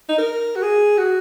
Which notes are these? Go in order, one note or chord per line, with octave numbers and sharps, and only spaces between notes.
D#4
A#4
F#4
G#4
F#4